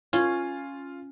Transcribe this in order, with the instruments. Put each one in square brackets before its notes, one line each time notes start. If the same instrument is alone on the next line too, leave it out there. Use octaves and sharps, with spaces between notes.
[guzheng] C#4 [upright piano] F4